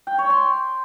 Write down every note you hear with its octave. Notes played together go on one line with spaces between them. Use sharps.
G5
C#5
C6